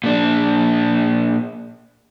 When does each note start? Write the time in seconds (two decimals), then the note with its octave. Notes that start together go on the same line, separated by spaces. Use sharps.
0.04 A#2 D4